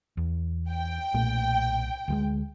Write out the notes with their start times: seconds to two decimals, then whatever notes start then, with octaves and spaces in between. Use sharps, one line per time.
0.17 E2
0.70 G5
1.14 B1 A#2 A3
2.08 D2 G3 G#3